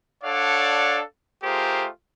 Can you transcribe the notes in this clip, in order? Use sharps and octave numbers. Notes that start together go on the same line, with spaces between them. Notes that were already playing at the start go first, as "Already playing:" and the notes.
D4 A4 C#5 D5 F5 F#5
A3 F4 G4 G#4 A#4 C5